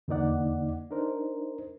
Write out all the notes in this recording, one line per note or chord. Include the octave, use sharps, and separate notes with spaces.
E2 D3 A#3 D#4 D5 F#5
D4 D#4 A#4 C5